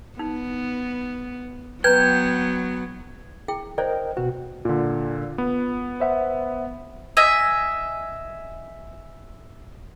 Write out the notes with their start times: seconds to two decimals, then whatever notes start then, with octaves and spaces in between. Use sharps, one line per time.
0.19 B3 D#4
1.84 F#3 B3 B4 G5 A#5 G#6
3.48 E4 G#4 G5
3.78 E4 A#4 C5 D5 D#5 G5
4.17 B2 F#4 B4
4.65 A#2 D3 F4
5.38 B3
6.00 C5 E5 F#5
7.17 D#5 E5 G#5